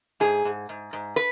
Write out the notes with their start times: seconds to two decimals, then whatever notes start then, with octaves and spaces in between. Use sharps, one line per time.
0.20 G#2 G#4
0.45 G#2
0.69 G#2
0.93 G#2
1.16 B4